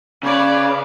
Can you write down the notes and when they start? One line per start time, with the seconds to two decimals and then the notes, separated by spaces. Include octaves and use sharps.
0.23 C#3 B4 C#5 D5